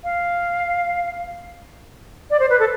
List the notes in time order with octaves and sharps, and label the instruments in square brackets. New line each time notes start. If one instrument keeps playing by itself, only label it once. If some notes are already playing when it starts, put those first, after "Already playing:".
[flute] F5
D5
C5
B4
A4